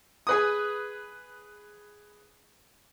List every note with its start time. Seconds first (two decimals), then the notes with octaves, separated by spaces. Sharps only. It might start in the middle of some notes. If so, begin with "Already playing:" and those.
0.27 G#4 B4 D#6